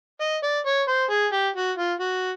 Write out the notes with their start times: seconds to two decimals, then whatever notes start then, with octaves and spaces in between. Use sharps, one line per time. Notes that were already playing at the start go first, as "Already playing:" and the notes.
0.21 D#5
0.43 D5
0.66 C#5
0.88 C5
1.10 G#4
1.33 G4
1.56 F#4
1.78 F4
2.00 F#4